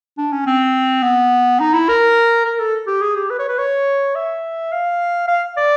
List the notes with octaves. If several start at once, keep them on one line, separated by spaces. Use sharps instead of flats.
D4
C#4
C4
B3
D#4
E4
A#4
A#4
A4
G4
G#4
G4
B4
C#5
B4
C#5
E5
F5
F5
D5